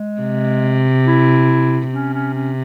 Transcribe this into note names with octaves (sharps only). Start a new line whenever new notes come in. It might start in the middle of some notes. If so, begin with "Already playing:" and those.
Already playing: G#3
C3
E4
C3 C#4
C#4
C#4